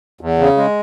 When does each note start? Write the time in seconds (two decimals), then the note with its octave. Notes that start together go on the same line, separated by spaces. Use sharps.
0.21 E2
0.39 C#3
0.57 G#3